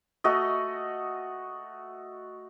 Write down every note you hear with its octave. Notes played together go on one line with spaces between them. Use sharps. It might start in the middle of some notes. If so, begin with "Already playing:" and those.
A3 F#4 D#5